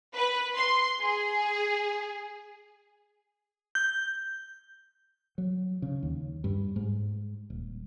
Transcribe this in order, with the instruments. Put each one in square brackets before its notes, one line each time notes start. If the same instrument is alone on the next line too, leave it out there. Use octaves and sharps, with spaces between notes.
[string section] B4
C6
G#4
[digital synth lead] G6
[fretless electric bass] F#3
C#3
D#2
G2
G#2
D#1